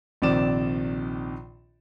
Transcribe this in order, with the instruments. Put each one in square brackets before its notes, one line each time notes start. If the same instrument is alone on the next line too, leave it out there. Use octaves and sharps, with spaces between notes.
[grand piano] A#1 C3 D#3 D5 E7